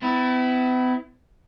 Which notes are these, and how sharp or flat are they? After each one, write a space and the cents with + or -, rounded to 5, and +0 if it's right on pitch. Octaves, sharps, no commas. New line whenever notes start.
B3 +45 E4 +0